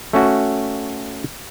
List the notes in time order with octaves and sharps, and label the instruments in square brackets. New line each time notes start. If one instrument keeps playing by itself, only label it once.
[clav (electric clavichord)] A3 C#4 F#4